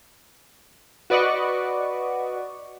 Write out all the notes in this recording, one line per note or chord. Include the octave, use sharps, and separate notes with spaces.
F#4 B4 D5 D#5 F#5 C#6